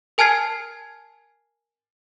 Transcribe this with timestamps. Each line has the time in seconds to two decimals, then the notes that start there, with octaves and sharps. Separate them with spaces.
0.18 A#4 G#5 A5 F6 G#6 C7